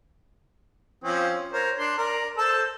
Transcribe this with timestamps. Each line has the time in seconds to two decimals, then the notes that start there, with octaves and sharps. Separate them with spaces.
1.04 F3 C4 C#4
1.53 A#4 C5 C#5
1.78 D4 C6
1.98 A#4 D5
2.38 A4 C5 A5